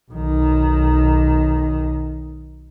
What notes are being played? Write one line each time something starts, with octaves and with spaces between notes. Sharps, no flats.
B1 D#3